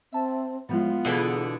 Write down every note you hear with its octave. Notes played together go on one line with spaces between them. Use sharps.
C4 E5 A5
A2 F3 F#3 G#3 B3 F4
B2 D3 E3 G#4 D#6 C#7